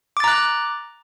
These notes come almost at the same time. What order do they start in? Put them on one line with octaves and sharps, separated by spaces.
D6 A6 A#5 F#6